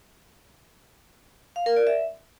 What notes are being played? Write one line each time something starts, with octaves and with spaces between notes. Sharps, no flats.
F5
A#4
D5
E5